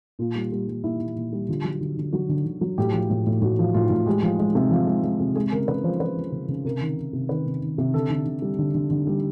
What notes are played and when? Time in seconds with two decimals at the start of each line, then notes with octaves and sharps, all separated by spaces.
0.19 A#2 F4
0.35 G3
0.52 G3
0.68 G3
0.84 A#2 E4
1.00 A#2
1.16 A#2
1.32 G3
1.48 D3 F4
1.64 F#3
1.81 D3
1.97 D3
2.13 F#3 F#4
2.29 D3
2.46 D3
2.61 F#3
2.78 A2 G4
2.93 F3
3.10 A2
3.26 A2
3.42 A2 F#4
3.59 F3
3.74 A2 F4
3.90 A2
4.06 G#3 G4
4.23 F3
4.39 G#3
4.55 C3
4.71 F3
4.87 G#3
5.03 G#3
5.20 C3
5.36 G#3 G#4
5.52 C#3 A#4
5.68 C#3 B4
5.84 F3 C5
6.00 F3 B4
6.17 F3
6.32 C#3
6.48 C#3
6.65 C3 A#4
6.81 D#3
6.98 D#3
7.13 C3
7.29 D#3 B4
7.46 C3
7.61 D#3
7.78 C3
7.94 D3 A4
8.10 D3
8.26 D3
8.42 G3
8.59 D3
8.74 D3
8.90 D3
9.07 G3